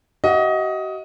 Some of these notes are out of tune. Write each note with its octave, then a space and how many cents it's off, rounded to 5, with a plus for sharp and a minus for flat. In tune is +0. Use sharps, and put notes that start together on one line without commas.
F#4 +45 D#5 +20 F#5 -40